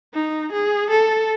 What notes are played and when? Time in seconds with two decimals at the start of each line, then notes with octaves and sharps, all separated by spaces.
0.14 D#4
0.52 G#4
0.91 A4